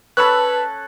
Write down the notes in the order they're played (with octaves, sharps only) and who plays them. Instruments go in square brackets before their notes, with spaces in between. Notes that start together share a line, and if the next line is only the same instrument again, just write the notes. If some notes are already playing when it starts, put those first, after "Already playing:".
[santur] C#4 A4 A5 [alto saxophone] B4 [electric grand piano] B5 E6 F#6